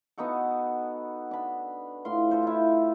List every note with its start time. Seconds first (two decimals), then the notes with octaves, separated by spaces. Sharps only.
0.18 B3 D#4 F#4 A4
1.31 D4 B5
2.05 A2 F4 C6
2.31 G4 A4 C5
2.43 E4 F4